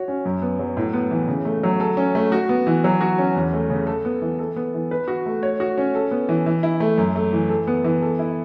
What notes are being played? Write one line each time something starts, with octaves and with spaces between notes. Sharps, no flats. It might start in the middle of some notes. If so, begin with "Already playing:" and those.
Already playing: F#4 C#5
C#4
F#2
B3
F#3
A2
B3
E3
C#3
A3
F#3
A4
C#4
A3
F#4
B3
E3
F#3
F#4
C#4
E2
A3
C#3
A4
B3
E3
A4
B3
E3
B4
F#4
A3
C#5
F#4
C#4
A4
B3
E3
E3
E4
A3
F#2
A3
E3
A4
B3
E3
A4
E4